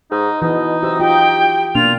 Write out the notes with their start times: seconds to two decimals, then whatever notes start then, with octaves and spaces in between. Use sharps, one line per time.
0.11 G#2 D#4
0.42 B2 E3 D#4
0.83 C3 F#4 E6
1.00 F4 G4 G5
1.75 B2 A#3 D4 F4 F7